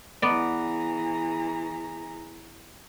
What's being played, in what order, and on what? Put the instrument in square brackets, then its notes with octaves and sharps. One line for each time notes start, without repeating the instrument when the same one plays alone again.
[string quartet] E3 G#4 A#5 [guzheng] B3 D5